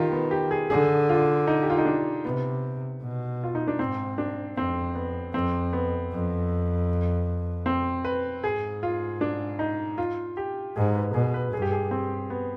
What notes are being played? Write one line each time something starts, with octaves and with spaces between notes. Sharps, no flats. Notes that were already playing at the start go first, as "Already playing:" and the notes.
Already playing: D#3 F4 G4
B3
G4
G#4
D3 G#4
F4
D#4
G4
F4
D#4
D4
C3 B3
B2
F4
D#4
D4
G#2 C4
D4
F2 C4
B3
F2 C4
B3
F2
C4
B4
G#2 G#4
F4
D4
D#4
F4
G4
G#2 G#4
B4
B2 G#4
B4
G2 G#4
G4
G#4
C4
B3